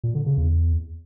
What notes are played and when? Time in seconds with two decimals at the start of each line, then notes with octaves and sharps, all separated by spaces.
0.04 A#2
0.15 D3
0.26 C#3
0.38 E2